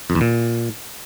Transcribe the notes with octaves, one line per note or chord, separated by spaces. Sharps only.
F2
E2
A#2